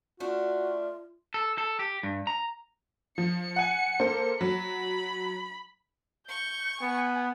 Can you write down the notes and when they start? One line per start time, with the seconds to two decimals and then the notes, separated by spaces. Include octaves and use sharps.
0.20 A3 D4 F4 F#4
1.34 A4
1.58 A4
1.79 G4
2.03 G2
2.27 A#5
3.18 F3 C#7
3.56 F#5 G#5
4.00 A#3 A4 C5
4.41 F#3 B5
6.29 C#6 G6
6.82 B3 G#5